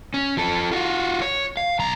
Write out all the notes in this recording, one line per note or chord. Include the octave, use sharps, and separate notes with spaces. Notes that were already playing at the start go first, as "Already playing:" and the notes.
C#4
F3 A4
F4 F#4
C#5
F5
B1 A#5